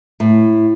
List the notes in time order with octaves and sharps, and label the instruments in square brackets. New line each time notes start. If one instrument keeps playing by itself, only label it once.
[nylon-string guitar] A2